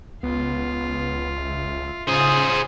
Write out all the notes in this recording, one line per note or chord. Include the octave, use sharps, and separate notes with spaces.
C#2 B3 F4
E5
C#3 F4 G#4 C5 D#6